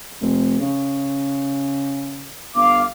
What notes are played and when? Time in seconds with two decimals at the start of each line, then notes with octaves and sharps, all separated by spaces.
0.21 F1
0.60 C#3
2.55 G1 F5 D6